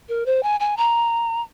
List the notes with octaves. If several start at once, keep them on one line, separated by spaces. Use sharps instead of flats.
A#4
C5
G#5
G#5
A#5